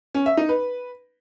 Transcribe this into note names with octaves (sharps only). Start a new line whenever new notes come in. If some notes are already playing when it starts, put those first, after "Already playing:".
C#4
E5
D#4
B4